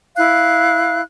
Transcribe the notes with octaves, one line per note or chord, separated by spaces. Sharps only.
E4 F5 F#6